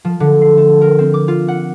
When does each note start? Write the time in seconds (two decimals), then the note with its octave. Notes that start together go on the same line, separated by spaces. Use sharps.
0.05 F3
0.20 D3
0.42 C7
0.57 A3
0.81 A#4
0.99 C4
1.14 D6
1.28 F4
1.48 F#5